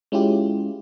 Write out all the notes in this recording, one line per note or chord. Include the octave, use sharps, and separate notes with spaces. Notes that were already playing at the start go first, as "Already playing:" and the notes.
G#3 C#4 E4 F4 G4